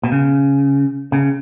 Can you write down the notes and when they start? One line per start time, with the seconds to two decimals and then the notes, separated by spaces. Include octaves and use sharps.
0.03 B2
0.12 C#3
1.12 C#3